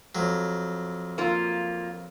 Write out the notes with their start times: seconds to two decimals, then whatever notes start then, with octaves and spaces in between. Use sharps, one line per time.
0.15 F2 F#3
1.18 A#3 F4